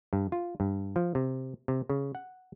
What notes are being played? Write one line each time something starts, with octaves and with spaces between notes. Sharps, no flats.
G2
F4
G2
F3
C3
C3
C#3
F#5